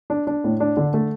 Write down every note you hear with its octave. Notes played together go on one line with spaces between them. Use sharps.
D4
D4
A2
D4
D3
A3